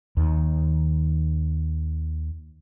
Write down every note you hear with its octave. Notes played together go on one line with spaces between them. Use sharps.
D#2 D#3